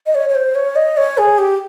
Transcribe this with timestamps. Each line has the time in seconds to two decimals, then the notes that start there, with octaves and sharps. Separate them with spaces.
0.06 D#5
0.15 C#5
0.29 C#5
0.35 C5
0.55 C#5
0.76 D#5
0.97 C#5
1.18 G#4
1.38 G4